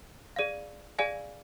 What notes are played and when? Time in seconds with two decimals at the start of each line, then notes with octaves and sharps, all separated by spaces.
0.36 G#4 D5 F5
0.99 G#4 D5 F5 G#5